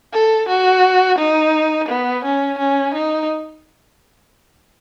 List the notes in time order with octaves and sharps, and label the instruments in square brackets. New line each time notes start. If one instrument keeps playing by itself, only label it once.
[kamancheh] A4
F#4
D#4
B3
C#4
C#4
D#4